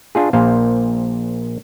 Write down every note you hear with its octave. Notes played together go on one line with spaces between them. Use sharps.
D4 F4 G#4
A#1 A#2 C5 F5